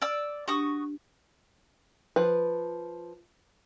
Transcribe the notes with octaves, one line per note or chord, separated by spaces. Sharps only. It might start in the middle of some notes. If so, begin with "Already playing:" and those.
D5 D6 E6
D4 F#4 G4 C#6 D#6
F3 B4